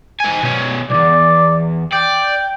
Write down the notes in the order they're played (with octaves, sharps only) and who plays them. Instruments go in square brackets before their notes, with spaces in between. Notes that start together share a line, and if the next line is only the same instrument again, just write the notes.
[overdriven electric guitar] D#3 G#5
B2 C#4
[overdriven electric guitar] B1 E2 [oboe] D5
[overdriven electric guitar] D5 [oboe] G5